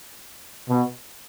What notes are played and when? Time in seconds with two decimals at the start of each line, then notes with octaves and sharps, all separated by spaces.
0.69 B2